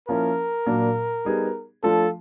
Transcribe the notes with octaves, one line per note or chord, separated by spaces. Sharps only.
F3 A#3 C#4 E4 A#4
A#2 F#3 A#3 D4
G3 B3 D#4 G#4
F3 A3 D4 F4 A4